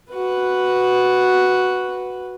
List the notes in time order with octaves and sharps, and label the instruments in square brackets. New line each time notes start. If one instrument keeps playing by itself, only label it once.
[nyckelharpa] F#4 B4